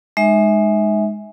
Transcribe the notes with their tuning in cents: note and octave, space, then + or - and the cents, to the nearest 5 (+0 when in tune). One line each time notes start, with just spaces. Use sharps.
G#3 +0 D#4 -25 E5 -20